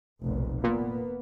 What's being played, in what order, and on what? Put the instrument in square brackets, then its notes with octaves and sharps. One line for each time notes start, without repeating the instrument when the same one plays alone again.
[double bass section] F1 B1 A#2
[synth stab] A#2 [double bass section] A#3 B3